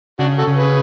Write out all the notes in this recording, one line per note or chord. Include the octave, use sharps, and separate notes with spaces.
C#3 D4 F#4
F#4 A4
C#3
G#4 B4